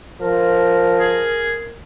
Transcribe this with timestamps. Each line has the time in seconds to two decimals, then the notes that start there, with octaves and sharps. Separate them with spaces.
0.21 F3 A#4
0.99 G#4